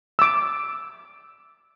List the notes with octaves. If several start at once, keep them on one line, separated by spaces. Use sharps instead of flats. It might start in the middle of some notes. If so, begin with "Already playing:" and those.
D6 E6